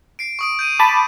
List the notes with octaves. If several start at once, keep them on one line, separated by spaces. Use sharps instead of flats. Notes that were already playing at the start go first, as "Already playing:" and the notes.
C7 D7
C#6 D#6 D7
G6 D#7
A5 B5 D6